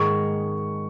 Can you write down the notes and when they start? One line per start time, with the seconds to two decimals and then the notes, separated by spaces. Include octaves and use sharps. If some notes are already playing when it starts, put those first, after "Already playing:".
Already playing: G#2 D#3 G#3 C#6